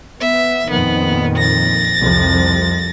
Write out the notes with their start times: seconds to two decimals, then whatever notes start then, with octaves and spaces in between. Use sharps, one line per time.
0.21 B3 E5
0.70 F2 A#2 D#3 B3
1.37 A6 A#6
1.99 C2 F2 C3